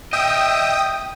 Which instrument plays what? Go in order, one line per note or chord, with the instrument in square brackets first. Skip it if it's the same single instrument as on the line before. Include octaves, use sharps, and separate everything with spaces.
[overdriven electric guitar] D#5 E5 [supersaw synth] G5 D#6